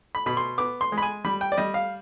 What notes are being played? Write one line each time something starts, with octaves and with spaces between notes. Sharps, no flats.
B5
B2 B5
C6
B3 D6
C6
G#3
B5
G#5
G3 B5
G5
D5
G3 D#5
F5